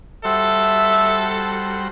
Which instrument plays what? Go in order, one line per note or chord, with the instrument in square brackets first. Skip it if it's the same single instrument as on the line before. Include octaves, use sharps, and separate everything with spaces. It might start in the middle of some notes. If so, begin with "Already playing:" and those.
[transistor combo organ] G3 F#4 C5 [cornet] A4 [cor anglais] E5